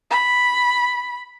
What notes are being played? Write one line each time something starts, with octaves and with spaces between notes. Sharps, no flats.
B5